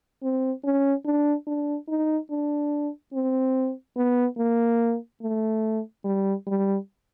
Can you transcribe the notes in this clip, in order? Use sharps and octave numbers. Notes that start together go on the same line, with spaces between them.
C4
C#4
D4
D4
D#4
D4
C4
B3
A#3
A3
G3
G3